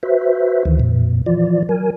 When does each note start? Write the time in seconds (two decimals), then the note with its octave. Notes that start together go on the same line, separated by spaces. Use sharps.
0.03 F#4 B4 C5 E5
0.65 D2 D#3 E3
0.80 F2 A#2
1.26 E3 F3 F4 D5
1.69 F#3 A#4 G#5